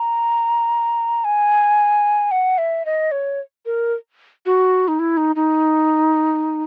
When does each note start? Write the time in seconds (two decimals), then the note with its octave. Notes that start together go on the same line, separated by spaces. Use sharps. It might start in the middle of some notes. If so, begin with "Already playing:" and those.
Already playing: A#5
1.24 G#5
2.31 F#5
2.58 E5
2.86 D#5
3.12 C#5
3.66 A#4
4.46 F#4
4.88 D#4
4.99 E4
5.17 D#4
5.36 D#4